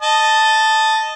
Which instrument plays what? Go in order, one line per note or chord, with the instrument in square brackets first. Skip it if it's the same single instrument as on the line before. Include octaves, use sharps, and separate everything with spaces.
[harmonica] D#5 A5